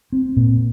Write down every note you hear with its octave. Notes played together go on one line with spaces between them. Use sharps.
C4
A#2